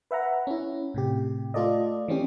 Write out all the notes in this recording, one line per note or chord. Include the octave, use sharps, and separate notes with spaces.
B4 E5 F#5 A#5
C#4 E4
A2 C3 G4
A3 F4 A4 D5 D#5
E3 C4 C#4 G4